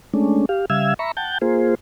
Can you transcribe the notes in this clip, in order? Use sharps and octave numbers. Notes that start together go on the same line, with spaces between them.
G#3 A3 C#4 D4
G4 F5
C#3 G3 E5 F5 E6 G#6
E5 A#5 B5 C#6
F#5 G5 A5 G6
A#3 F4 G#4 C5